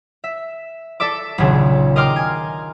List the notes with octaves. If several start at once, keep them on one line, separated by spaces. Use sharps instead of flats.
E5
A4 D5 E5 D6
D#1 B1 C#3 D4 G#4
A#4 D#5 G5 C6 D6 F6
G#5